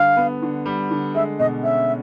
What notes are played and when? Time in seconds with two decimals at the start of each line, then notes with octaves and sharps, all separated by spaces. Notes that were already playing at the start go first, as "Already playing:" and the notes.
Already playing: D3 G3 F5
0.17 B3
0.42 D3
0.66 G3
0.91 D3
1.14 G#3 E5
1.39 B2 D#5
1.63 C#4 E5